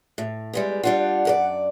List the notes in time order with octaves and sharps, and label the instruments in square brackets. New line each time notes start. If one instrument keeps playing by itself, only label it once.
[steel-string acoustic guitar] A2
G3 G#3 B3
[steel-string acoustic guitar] G3 D4 F4 [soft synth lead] F#5
[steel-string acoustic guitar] F#2 A#4 D5